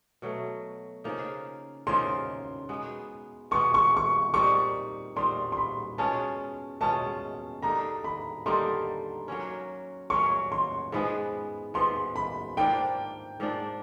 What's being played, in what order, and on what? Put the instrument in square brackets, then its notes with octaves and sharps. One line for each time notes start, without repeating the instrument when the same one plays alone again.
[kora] B2 F#3 A3
C#3 F3 A#3 D#4
[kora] C#3 F3 A#3 D#4 [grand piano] C6
[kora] B2 G#3 B3
[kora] B2 G#3 B3 [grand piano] C#6
[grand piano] C#6
C#6
[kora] A#2 G3 C4 D#4 [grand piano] C#6
[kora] A#2 G3 C4 D#4 [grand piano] C6
[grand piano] C6
B5
[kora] B2 G#3 C#4 F4 [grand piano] A5
[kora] B2 G#3 C#4 F4 [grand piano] A5
[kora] D3 G3 A#3 D#4 [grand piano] A#5
[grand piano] B5
[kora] D3 G3 A#3 D#4 [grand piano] C6
[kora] F#3 A#3 C#4
[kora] F#3 A#3 C#4 [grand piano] C#6
[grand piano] C6
[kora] G#2 F3 G#3 B3 [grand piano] B5
[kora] G#2 F3 G#3 B3 [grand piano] C6
[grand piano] B5
[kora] G#2 F3 A#3 D4 [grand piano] G5
[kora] G#2 F3 A#3 D4